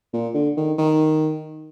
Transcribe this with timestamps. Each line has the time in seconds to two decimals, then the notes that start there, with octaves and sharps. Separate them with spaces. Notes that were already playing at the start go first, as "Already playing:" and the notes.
0.13 A#2
0.34 D3
0.57 D#3
0.78 D#3